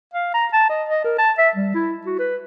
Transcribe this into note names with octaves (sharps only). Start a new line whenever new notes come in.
F5
A#5
A5
D#5
D#5
A#4
A5
E5
G3
E4
F#4
B4